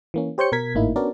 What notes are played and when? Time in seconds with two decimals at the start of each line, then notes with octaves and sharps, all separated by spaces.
0.14 E3 A#3 C#4
0.38 G4 C5 C#5 G6 C#7
0.52 B2 A#4 G#6 B6
0.75 G#1 A2 A#3 D#4 E4
0.96 B3 C#4 D4 F#4 A#4 D5